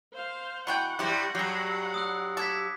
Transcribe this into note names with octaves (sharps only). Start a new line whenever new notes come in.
C5 F5
B2 E3 F#5 G5 B5 C#6 F#6
G2 G3 E4 G4 C5 A#6 C#7
G2 F#3 G4 G#4 C7
D#6 E6 F#6
A4 D6 G#6 B6